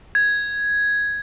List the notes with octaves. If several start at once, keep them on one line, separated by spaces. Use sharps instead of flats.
G#6